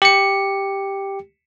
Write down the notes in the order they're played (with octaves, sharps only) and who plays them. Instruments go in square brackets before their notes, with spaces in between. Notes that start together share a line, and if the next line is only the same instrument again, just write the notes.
[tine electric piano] G4 C#7